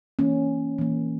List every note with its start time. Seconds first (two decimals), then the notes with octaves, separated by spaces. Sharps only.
0.19 E3 A#3 C#4
0.79 E3 A#3